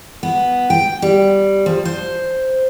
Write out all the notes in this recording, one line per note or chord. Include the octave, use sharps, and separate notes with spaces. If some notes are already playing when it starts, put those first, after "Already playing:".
B3
G5
G3
F3
C5